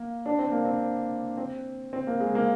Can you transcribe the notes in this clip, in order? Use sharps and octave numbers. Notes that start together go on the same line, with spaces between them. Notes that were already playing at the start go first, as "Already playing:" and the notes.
Already playing: A#3
D4
C4
A#3
C4
C4
C4
A#3
G#3
A#3